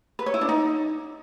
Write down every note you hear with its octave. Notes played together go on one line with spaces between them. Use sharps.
B4
C#5
E4
D4
D#4